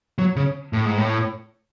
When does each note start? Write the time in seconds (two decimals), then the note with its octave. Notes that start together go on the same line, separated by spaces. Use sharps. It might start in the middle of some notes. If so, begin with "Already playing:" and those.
0.18 F#3
0.36 C#3
0.73 A2
0.85 G#2
0.98 A2